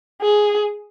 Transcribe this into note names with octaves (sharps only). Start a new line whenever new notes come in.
G#4